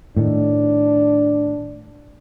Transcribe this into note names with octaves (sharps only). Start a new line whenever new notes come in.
A2 D#3 D4